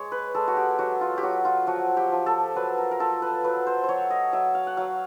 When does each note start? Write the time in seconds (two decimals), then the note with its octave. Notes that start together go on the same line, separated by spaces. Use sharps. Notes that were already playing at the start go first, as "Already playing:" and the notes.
Already playing: G#3 C#5
0.12 B4
0.35 G#3 A4
0.47 F#4
0.57 G4
0.79 F#3 F#4
1.01 F4
1.18 G4
1.23 F#3 F#4
1.45 F4
1.67 F3 F#4
1.97 G4
2.12 F3
2.26 A4
2.56 F#3 B4
2.78 A#4
2.91 A#4
3.00 F4 A4
3.22 B4
3.44 F#3 B4
3.67 C5
3.84 F#3 C5 C#5
4.10 D#5
4.33 F#3 E5
4.55 F5
4.67 F#5
4.77 F#3 F5